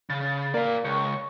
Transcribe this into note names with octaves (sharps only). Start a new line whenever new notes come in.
C#3 A6
A#3 D5 F5
C#2 C#6